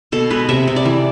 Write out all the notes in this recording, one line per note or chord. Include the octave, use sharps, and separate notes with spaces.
B2 A4
G#3 B4
C3 E5
C3
D5
E3